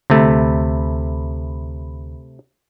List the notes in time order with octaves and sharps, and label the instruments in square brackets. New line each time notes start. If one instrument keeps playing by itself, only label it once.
[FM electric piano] D2 B5 [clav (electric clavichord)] C3 A3